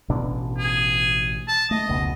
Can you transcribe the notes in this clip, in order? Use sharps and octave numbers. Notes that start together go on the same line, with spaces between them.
A1 B2 D4
G#4
A5
A3 D#5
F1 C#2 B2